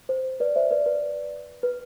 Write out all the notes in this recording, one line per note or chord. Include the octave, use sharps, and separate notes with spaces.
C5
B4 D5
C5 E5
B4 D5
B4
B4